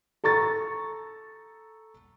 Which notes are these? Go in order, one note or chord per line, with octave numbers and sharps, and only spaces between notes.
A4 A#5 C#6 A6